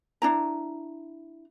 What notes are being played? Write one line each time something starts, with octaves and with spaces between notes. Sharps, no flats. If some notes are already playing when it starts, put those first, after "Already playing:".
D4 E4 A#5